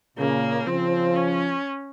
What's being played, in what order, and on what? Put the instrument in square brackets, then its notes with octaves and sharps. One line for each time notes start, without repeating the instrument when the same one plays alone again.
[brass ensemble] A#2 C#3 [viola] A#3
[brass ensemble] C#3 F3 [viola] C4
[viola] C#4